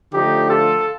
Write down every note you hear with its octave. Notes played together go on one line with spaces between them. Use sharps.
D3 F3 A3 D#4 G4
F4 A4